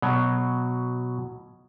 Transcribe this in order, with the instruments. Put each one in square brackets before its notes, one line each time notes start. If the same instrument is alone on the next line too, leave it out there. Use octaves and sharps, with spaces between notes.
[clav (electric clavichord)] B2 F#3